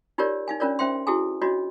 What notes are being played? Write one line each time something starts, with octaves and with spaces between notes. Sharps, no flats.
D#4 F4 G4 A#4 C#5 D5
D#4 F5 G#5
C#4 D4 F4 A#4 C#5 D5
C#4 C5 E5 G5 C6
E4 F#4 G#4 A4 G#5
D4 F4 F#4 C#5 D#5